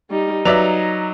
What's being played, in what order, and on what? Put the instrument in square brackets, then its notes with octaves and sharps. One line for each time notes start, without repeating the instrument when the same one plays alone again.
[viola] G3 D#4
[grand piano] F#3 F7 [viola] D#4 [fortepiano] B4 D5 E5